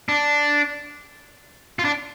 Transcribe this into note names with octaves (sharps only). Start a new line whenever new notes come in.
D4
F4
D4